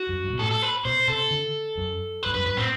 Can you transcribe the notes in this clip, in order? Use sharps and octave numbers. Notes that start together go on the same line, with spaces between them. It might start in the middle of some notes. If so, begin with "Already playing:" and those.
Already playing: F#4
F#2
G2
B2
A2 A4
A4
B4
B2 C5
C3 A4
D3
F#2
B4
G2
F#2 B4
G2 B4
A2 C4